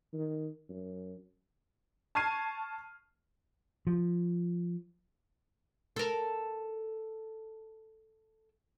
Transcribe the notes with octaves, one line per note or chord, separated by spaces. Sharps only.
D#3
F#2
A5 C#6 F6 G#6 C7 D#7
F3
A4 A#4